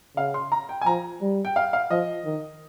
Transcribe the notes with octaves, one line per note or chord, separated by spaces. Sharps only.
C#3 F5
C6
A#5
G5
G#5
F3 A#5
G3
G5
F5
F5
F3 D#5
D#3